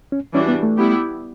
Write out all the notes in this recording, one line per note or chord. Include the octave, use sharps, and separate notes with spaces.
C#4
E3 G3 C#4 D4 F#4
B3
A3
G3 B3 E4 G4